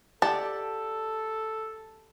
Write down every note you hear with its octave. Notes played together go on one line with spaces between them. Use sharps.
G4 A4 D5 F#5 A5